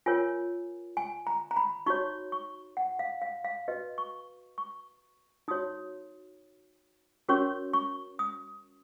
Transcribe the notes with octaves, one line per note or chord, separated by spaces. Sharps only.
F4 A#4 C#5 G#5
G#5
A#5
A#5
B5
D#4 F#4 C#5 C#6
C#6
F#5
F5
F5
F5
F#4 B4 D#5
C#6
C#6
D#4 F#4 C#5 D#6
C#4 F#4 A#4 C#5 C#6
C#6
D#6